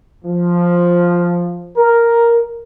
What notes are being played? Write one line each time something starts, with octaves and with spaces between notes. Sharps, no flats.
F3
A#4